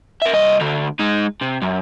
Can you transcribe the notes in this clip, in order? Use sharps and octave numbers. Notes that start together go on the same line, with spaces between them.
A#4 E5
C2 D#5
D2 D3
G#3 D#4
C3
F#2